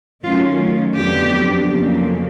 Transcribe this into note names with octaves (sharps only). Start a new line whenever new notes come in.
D#3 F#3 A3 C#4 F4
F2 D3 F#3 B3 D4 G4
F2 C#3 F#3 A#3